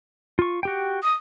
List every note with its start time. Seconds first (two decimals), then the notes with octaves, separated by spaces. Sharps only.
0.39 F4 C#6
0.63 F#4 G4 G5
1.03 D#6